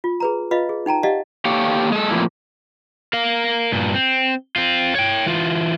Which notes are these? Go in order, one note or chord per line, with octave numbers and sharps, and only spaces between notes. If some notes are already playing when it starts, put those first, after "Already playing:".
F4
G#4 B4 A#5
F4 B4 D#5 F5
G#4
D#4 G5 A5 A#5
G4 D5 D#5 F5 F#5 A5
A#3 G4 A4 C#5 F5 G5
G#3 A4
F2 A2 E3 F3 A#3 E4
A#4 F5
G2 A#2
C4
C4 F4
C#5 G5
E3 F4